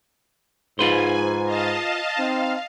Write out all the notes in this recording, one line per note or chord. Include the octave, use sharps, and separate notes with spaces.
G#2 F4 B4 C5 G#5
D#5 F5 A5
C4 D#4 F5